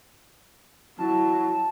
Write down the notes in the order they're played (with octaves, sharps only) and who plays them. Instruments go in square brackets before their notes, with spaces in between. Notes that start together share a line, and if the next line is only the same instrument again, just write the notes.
[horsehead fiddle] F#3 E4 [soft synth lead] A5